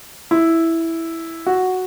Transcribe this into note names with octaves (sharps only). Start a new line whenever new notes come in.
E4
F#4